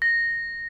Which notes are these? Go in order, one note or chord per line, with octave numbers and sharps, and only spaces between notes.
A#6